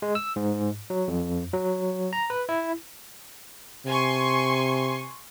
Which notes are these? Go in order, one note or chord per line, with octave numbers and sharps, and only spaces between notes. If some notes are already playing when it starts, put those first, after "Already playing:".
G#3
E6
G#2
F#3
F2
F#3
A#5
B4
E4
C3 G#5 C6 C#6